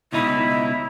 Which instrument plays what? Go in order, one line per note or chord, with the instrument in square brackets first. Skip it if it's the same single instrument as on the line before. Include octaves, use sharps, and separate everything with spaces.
[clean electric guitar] C#2 B2 D#4 [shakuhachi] E4